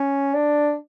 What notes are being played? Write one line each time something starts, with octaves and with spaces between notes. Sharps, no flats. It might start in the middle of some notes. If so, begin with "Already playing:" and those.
Already playing: C#4
D4